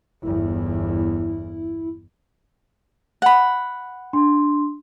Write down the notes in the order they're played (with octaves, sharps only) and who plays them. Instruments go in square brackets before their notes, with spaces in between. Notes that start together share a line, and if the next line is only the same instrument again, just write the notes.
[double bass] G1 E2 [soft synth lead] E4
[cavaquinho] F#5 B5
[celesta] D4 C6